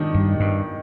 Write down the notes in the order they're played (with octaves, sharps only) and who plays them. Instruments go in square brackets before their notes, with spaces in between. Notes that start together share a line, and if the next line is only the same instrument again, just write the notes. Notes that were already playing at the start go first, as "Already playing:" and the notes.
Already playing: [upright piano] D#3 D4 D#4
[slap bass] G2
G2